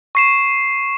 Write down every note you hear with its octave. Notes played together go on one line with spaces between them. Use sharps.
C#6 C7 E7